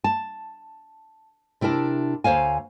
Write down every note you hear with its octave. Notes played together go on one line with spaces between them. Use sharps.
A5
C3 D4 E4 A#4 A5
D2 C5 C#5 F5 G#5